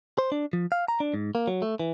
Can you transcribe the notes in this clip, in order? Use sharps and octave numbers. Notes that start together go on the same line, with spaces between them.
C5
D4
F3
F5
A#5
D4
G#2
A#3
F#3
A3
E3